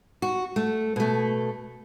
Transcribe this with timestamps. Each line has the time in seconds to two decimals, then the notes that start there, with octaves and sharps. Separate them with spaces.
0.22 F#4
0.56 A3
0.96 B2 A3